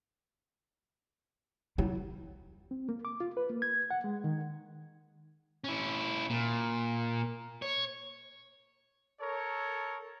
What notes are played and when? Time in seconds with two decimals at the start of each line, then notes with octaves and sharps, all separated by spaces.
1.78 F1 F#3 G3 E4
2.71 C4
2.89 A#3
3.05 D6
3.20 F4
3.37 B4
3.50 A#3
3.62 G#6
3.91 F#5
4.04 G#3
4.24 D#3
5.64 C#4 E4
6.30 A#2
7.62 C#5
9.21 A4 A#4 C#5